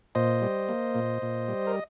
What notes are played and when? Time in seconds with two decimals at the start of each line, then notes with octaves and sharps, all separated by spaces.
0.15 A#2 C5 D#5
0.42 G3
0.69 A#3
0.95 A#2
1.22 A#2
1.48 G3
1.67 A#4